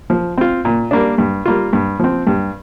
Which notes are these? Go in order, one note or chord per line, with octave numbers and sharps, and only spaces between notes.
F3
C4 F4
A#2
G3 A#3 D4
G2
G3 A#3 F4
G2
F3 C4
G2